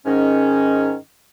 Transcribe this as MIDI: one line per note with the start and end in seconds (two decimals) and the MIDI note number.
0.06 0.93 44
0.06 0.93 51
0.06 0.93 61